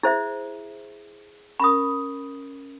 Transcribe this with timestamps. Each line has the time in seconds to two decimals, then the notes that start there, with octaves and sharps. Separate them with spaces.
0.03 E4 G#4 C5 E5
1.60 C#4 A#4 B5 D#6